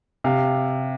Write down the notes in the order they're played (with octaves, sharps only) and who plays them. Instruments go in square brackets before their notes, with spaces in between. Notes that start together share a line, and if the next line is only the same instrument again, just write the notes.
[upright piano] C3 F5